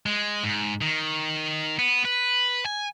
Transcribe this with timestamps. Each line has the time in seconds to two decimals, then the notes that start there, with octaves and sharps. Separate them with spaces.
0.06 G#3
0.44 G#2
0.81 D#3
1.79 B3
2.05 B4
2.66 G#5